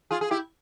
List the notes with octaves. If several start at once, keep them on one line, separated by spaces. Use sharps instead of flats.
F4 G#4
G#4
E4 G4